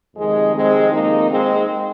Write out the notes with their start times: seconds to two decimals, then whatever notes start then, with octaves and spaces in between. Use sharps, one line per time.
0.16 F2 C3 D#3 G#3
0.54 G#3 C4
0.92 A#3 D#4
1.29 G#3 C4